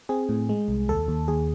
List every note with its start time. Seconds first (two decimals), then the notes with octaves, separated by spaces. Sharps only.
0.09 C4 G#4
0.29 A2
0.49 G#3
0.68 C2
0.89 D#2 A4
1.08 D#2
1.28 D#2 G#4